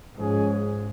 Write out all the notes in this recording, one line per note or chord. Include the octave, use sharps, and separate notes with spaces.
G#2 F3 G#3 C#4 G#4